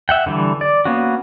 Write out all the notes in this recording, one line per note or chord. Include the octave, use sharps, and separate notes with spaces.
E5 F#5 G5
D3 E3 G3
D5
A#3 B3 C#4 F#4